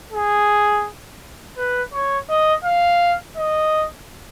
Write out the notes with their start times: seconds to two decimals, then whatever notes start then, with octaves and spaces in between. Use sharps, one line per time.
0.13 G#4
1.57 B4
1.93 C#5
2.29 D#5
2.64 F5
3.37 D#5